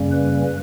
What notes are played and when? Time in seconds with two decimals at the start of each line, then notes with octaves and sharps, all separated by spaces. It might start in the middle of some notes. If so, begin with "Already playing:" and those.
Already playing: F#2 C#3 G3 A#3 C#4
0.11 B4